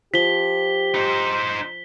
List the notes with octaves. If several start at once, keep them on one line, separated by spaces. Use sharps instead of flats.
F3 G4 B6 G7
D#4 C5